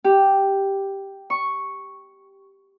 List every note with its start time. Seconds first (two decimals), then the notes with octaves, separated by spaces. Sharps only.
0.04 G4
1.30 C#6